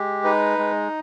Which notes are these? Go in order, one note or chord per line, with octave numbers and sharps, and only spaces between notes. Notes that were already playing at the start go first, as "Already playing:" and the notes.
Already playing: G#3 G4
D#4 B4
G#3